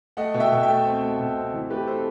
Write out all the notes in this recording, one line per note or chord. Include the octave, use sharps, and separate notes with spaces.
A3 D#5 F#5
B2
E5 G5
B2
E5 G5
A3
C4
A3
B2
C4
E3
A3 G4 B4
C4 A4 C5